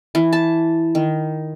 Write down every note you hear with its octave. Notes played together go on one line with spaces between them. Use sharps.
E3
A5
D#3